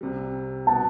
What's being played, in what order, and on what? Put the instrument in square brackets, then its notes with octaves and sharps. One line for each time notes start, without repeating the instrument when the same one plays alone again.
[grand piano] C2 C3 G3
[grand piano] B2 G3 B3 [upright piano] A5